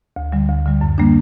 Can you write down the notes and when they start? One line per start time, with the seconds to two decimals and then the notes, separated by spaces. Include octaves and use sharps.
0.16 D2
0.32 D3 G3
0.49 D2
0.66 D3 G3
0.81 F#2
0.98 D3 G3 A#3 D4